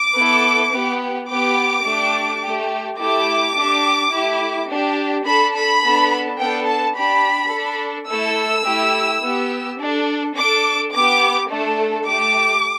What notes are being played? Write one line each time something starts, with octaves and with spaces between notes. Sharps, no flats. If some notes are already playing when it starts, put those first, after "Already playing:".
Already playing: D6
B3 E4 A4
B3 G4
B3 G4 D6
A3 D4 G4
A3 G4
A3 E4 G4 D6
D4 G4
A3 E4 G4
D4 G4
D4 A4 B5
B5
B3 D4 A4
B3 D4 A4 G5
A5
D4 G4 B5
D4 A4
A3 E4 A4 E6
A3 E4 G4
B3 G4
D4 A4
D4 A4 D6
B3 G4 D6
A3 D4 A4
A3 G4 D6